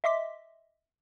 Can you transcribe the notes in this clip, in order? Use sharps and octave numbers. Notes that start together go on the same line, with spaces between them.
D#5 E5 C6 D6 B6